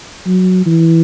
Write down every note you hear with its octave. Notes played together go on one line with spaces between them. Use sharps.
F#3
E3